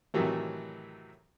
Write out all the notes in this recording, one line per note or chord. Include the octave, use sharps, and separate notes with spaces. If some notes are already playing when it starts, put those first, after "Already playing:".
A2 C3 D#3 E3 F#3 A3